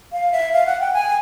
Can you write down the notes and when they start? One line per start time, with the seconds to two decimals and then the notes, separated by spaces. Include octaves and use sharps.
0.12 F5
0.32 E5
0.52 F5
0.66 F#5
0.81 G5
0.94 G#5